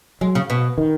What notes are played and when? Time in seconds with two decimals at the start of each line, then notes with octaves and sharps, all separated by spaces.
0.21 F#3 G#3
0.35 C#3
0.50 B2
0.78 D#3